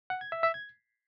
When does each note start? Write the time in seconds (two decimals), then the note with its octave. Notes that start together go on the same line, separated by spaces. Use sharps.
0.10 F#5
0.21 G#6
0.32 E5
0.43 E5
0.54 G#6